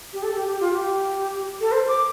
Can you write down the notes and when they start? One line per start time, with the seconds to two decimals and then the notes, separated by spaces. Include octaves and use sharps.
0.13 G4
0.23 A4
0.35 G4
0.48 G4
0.60 F4
0.73 G4
1.61 A4
1.72 C5
1.88 D6